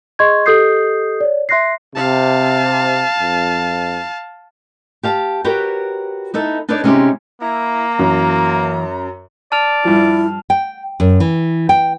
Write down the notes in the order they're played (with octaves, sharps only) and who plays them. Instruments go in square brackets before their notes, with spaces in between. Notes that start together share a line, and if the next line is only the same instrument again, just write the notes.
[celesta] G#4 D#5 C6 C#6 G#6
G4 A4 D#5 D#6 G6 C7
C#5 D5
E5 C6 F#6 A#6 C7
[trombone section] C3 [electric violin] F5 A5
[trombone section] F2
[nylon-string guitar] G4 F5 A5
F#4 G4 A#4 B4 C#5 G5
B3 D#4 E4 A4
D4 D#4 A4 B4 C#5 D5
C3 G#3 C#4 D#4 E4 G4
[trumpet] A#3 [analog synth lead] E4 [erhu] A#5
[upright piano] F#2 [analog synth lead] E3
[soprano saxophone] D5 [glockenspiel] A5 F6 F7
[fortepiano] G2 F3 [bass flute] E4
[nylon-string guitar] G5
F#2
E3
G5